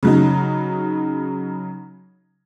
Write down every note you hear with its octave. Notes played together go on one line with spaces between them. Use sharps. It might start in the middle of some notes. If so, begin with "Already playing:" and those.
C#3 F#3 D#4